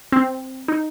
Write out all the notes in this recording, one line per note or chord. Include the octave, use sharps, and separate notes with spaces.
C4
D#4